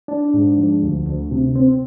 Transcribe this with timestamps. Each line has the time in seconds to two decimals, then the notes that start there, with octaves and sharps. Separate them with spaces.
0.08 D4
0.34 G#2
0.58 F3
0.83 D2
1.06 D2
1.31 C3
1.55 C4